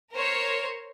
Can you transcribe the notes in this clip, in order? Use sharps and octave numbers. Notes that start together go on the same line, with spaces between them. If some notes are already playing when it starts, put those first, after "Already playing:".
A#4 C5 C#5